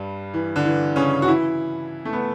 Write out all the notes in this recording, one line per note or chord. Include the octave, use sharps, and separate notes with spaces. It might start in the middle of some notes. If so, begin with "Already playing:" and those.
Already playing: G2 G3
E3
D3
E3
C#3 C#4
F#4
E3 E4
A3
B3